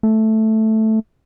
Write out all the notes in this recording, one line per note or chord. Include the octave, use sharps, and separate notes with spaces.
A3